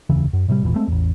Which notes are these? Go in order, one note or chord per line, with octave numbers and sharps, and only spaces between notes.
F1 D#2 C#3 E3
F#2
A2 C3 E3 G3
G#1 E2 A#2 E3
G#3 A3 C4
A1 E2